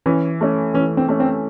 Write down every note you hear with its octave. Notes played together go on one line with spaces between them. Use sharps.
E3 C#4
A3 C#4
E3 C#4
C4
A3 C#4
C4